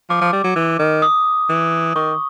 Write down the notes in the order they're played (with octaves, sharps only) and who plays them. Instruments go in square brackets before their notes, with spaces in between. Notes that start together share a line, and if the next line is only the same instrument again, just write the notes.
[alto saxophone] F3 [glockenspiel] D6
[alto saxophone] F3
G3
F#3
E3
D#3
[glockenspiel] D#6
[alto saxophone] E3
[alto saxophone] D#3 [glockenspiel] C#6